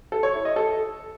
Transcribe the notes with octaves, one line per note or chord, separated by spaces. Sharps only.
A4
C#5
E4
D#5
A4